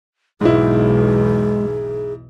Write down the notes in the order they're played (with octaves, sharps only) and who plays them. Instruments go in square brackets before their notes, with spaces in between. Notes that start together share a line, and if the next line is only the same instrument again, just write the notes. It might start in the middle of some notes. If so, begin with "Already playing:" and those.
[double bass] B1 E2 [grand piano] G#2 E4 [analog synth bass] G#3 [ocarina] G#4